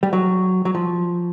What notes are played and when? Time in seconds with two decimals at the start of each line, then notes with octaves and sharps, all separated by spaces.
0.03 G3
0.13 F#3
0.65 F#3
0.75 F3